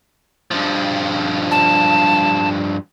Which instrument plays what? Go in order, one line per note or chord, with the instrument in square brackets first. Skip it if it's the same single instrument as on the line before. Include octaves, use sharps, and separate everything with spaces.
[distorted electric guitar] G2 F3
[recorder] A5